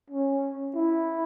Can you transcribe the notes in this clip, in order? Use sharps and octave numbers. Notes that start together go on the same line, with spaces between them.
C#4
E4